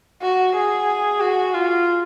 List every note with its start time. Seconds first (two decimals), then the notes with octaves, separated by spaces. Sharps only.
0.22 F#4
0.56 G#4
1.20 F#4
1.54 F4